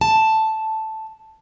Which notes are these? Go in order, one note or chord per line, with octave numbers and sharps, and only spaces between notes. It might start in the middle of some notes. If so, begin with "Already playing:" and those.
A5